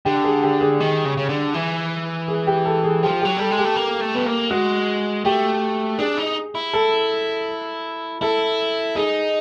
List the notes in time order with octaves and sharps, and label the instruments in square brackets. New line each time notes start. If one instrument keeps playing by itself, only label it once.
[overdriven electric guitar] D3 [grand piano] G4
[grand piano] G#4
G4
G#4
[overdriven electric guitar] D#3
C#3
C#3
D3
E3
[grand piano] G#4
G4
A4
G#4
[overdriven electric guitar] F3 [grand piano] G4
[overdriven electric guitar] F#3 [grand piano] G4
[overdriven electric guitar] G3 [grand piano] A4
[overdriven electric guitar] G#3
[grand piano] G4
[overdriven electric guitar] A3
A#3
A3
B3
A#3
[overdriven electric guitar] G#3 [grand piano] F#4
[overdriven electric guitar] A3 [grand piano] G4
[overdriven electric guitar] D4 [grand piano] G#4
[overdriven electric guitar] D#4
E4
[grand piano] A4
[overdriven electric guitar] E4 [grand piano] A4
[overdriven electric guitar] D#4 [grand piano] G#4